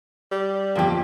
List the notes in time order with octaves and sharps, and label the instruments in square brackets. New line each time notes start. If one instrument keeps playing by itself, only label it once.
[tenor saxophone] G3
[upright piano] G1 F2 [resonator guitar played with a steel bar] A#3 G4